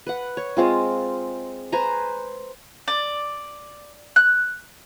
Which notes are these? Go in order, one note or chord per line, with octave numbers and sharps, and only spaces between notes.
B4 F#5
C#5
G#3 C4 F4
B4 C5 G#5 A#5
D5
F#6